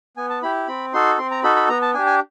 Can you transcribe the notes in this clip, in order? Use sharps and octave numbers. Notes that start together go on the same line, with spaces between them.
B3 G#5
A5
E4 G4 B5
C4 B5
D#4 F#4 A4 C6
C4 C6
A#5
D#4 F#4 A4 B5
B5
B3 A#5
A5
D4 G4 G#5
G#5